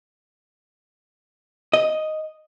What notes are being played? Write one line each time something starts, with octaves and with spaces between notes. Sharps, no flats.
D#5